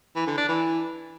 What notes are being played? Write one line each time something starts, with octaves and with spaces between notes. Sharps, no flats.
E3
D3
D4
E3